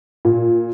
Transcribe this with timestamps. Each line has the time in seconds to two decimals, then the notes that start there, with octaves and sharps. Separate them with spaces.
0.25 A#2